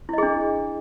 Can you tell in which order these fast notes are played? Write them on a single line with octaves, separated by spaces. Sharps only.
E4 D#5 G#4 D4